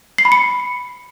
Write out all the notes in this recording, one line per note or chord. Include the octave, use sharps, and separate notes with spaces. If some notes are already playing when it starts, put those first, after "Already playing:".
C7
B5
C#7